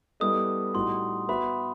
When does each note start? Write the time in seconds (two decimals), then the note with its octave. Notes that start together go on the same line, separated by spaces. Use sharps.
0.20 G3 B3 E4 A4 D#5 D#6
0.74 A2 G3 D#4 F#4 C6
1.28 B3 F#4 B4 E5 B5